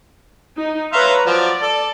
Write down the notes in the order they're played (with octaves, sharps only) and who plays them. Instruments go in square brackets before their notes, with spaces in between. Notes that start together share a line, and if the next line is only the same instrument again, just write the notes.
[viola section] D#4
[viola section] B4 C#5 A#5 [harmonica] E5 F5 C6
[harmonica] F3 F#3 [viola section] D5
[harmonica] A4